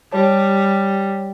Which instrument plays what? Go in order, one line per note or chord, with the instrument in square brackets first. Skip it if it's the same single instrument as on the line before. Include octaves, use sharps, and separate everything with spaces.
[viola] G3 [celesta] G4 C#5 A5